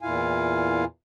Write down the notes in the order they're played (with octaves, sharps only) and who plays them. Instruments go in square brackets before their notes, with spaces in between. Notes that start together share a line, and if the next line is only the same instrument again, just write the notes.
[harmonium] E2 A#2 E4 F4 F5 G#5